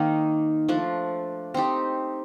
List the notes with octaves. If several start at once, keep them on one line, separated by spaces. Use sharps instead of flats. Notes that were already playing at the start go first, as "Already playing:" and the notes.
Already playing: D#3 A#3 C4 D#4
F3 A3 D4
C4 D#4 G4